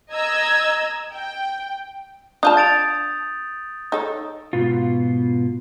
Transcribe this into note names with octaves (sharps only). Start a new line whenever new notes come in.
D#5 A#5 E6 G#6
G5
D4 F4 A5 D#6 G6
A6 D7 F7
D#4 A4 C#5
G#2 B2 B3 F4